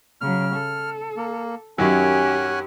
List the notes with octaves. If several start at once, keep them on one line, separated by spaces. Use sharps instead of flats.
C#3 F#3 F6
A4
A#3
F#2 D#3 F#3 C#4 G4 F#5 G#5